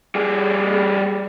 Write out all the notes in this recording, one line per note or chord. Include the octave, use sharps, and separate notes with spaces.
G3 G#4